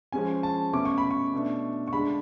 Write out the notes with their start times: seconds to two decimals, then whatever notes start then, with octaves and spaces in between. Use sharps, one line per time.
0.12 F3 G#3 C#4 G#5
0.43 A5
0.73 B2 A3 C#4 D6
0.85 C#6
0.98 B5
1.11 C#6
1.33 B2 A3 D4
1.88 C#6
1.93 D3 G#3 D4 B5